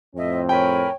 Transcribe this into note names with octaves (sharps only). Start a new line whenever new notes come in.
F2 A2 C4 D#5 E5
A#4 C#5 G5 G#5 B5